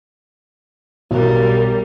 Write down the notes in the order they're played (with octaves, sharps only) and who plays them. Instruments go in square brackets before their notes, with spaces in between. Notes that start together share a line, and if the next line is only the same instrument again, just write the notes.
[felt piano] B1 [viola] G3 A#4